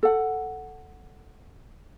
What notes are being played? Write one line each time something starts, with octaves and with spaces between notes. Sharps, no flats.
A4 F#5